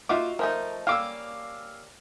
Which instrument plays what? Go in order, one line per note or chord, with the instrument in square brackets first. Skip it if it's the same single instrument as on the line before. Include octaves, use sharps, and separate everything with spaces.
[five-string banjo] D#4 F#4 E5 [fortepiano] F4 D6
[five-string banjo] F3 A3 D#4 [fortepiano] A#4
[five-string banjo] G3 A#3 C#4 [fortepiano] F5 D6 E6